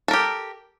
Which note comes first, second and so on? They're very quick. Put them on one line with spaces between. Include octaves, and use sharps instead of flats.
A4 A#4 G4